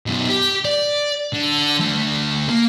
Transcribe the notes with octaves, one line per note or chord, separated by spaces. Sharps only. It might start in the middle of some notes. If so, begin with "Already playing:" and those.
F#2 B2
G4
D5
D3
D2 A3
A#3